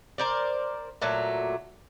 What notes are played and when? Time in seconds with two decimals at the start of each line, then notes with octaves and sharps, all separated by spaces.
0.18 A#4 C5 D5
1.02 A#2 F#3 A3